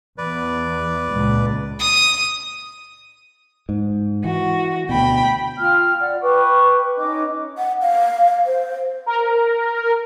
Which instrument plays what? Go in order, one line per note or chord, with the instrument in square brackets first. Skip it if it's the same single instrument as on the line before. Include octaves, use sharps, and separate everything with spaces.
[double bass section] E2 [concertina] B4 D5
[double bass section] C#2 A#2
[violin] D#6
[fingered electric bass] G#2
[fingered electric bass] E3 [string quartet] F#4
[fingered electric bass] D2 B2 [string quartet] G5 B5
[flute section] F4 G5 F6
D5 F#5
B4 G5 C#6 D6
C#4 D#4 D#5 D6
[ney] F#5
F5
C5
[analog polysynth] A#4